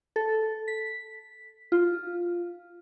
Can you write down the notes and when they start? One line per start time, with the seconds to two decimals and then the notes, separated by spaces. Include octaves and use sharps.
0.16 A4
0.68 B6
1.72 F4